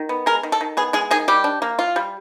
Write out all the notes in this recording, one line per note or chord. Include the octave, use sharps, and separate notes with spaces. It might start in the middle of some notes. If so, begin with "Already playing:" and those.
Already playing: D#3
B3
G#3 A#4
D#3
A4
D#3
B3 G#4
G#3 G#4
D#3 G#4
G3 G4
D4
A#3
F4
G3